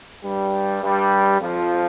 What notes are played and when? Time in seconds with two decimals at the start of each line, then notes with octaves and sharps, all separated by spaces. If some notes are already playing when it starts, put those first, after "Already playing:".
0.23 G2 G3
0.82 G2 G3
1.40 F2 F3